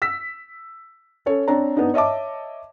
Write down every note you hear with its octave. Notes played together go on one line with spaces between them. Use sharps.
E6 B6
C#4 A4 C#5
C4 D4 C#5 A#5
B3 D4 D#4
C#5 D#5 E5 A5 D6